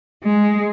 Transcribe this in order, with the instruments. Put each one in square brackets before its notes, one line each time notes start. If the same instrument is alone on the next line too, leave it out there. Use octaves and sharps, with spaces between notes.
[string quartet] G#3